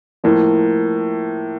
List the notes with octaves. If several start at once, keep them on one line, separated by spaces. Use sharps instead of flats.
A2 F3 A#3